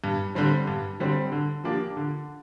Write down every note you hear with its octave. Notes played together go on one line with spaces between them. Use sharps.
G2
D3 G3 C4
G2
D3 G3 C4
D3
F3 A#3 D4 G4
D3